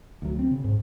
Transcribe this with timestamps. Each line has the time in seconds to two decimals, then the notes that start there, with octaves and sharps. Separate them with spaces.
0.22 D2 F#3
0.39 C4
0.51 C#3
0.64 G#2